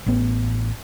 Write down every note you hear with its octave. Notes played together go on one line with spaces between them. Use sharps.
A1 B3